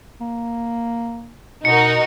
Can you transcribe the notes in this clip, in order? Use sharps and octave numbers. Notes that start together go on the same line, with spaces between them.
A#3
B2 D#4 F#4 A#4 C#7